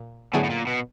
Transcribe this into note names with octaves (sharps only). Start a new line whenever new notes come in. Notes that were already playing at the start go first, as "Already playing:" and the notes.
Already playing: A#2
A2 D3 F#3 B3 E4 G#4
A2
A#2
B2